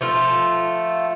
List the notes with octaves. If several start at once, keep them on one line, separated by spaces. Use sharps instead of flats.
F3 A3 F4